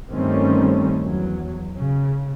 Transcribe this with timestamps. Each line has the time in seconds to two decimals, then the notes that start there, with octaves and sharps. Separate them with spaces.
0.12 G2 D#3 G3 A3 C4 C#4
1.02 E2 F#3
1.80 C#3